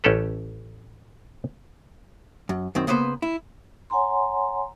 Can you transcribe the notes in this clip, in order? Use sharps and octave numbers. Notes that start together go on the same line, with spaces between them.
A1 C#4 G4 A4 B4
F#2
F#2 D#3 C4
C#3 A#3 B3 B4 C5
E4
C#5 F#5 G#5 A#5 C6